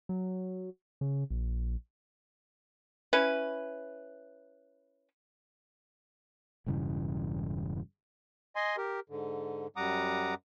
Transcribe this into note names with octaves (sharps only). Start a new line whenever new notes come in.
F#3
C#3
A#1
C#4 E4 B4
E1 G2 C#3 E3
D#5 G#5 C6
G4 A#4
G#2 D3
F#2 G3 F#5 A#5 D6 D#6